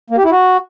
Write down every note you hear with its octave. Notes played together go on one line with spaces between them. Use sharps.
A#3
G4
E4
F#4